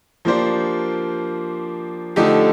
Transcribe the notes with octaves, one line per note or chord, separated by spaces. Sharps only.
F3 A#3 D4 G4 C5
D3 F3 A3 D#4 G4